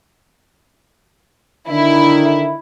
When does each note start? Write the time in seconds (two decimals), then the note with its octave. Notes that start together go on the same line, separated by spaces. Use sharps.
1.69 D3 D#3 D4 E4